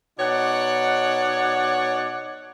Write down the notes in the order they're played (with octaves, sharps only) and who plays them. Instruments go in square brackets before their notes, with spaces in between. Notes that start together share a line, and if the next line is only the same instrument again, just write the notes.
[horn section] B2 D#4 C#5 D5 F#5